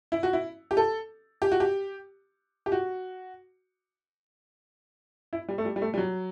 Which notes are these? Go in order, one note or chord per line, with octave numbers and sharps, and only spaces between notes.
E4
F#4
E4
G4
A4
G4
F#4
G4
G4
F#4
E4
G3
A3
G3
G3
A3
G3
F#3